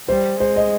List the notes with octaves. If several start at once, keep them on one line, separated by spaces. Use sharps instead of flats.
G3 C5
G#3 C5
D#5